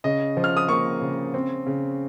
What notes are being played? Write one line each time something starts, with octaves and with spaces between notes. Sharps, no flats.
C#3 D#5
F3
F6
D#6
A#3 C#6
C#3
C4
C#3